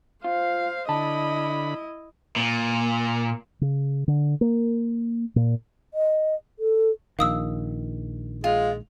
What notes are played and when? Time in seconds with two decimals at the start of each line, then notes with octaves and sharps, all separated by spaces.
0.24 F4 C5 F5
0.89 D3 E4 D#5 A5 B5
2.36 A#2
3.61 C#3
4.08 D3
4.41 A#3
5.36 A#2
5.94 D#5
6.59 A4
7.19 A#1 D#3 F5 D#6 E6
8.44 G#3 F4